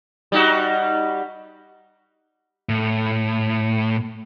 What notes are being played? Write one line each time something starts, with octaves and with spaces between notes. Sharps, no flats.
G3 D#4 F#4
A2